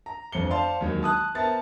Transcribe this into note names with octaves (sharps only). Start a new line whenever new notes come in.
A#5
G1 F2 C4 C#7 G7
C5 D5 F5 A5 C6
D#2 D#3 F#3 G#3
A5 D#6 F#6
B3 A#4 C5 E5 A5 A6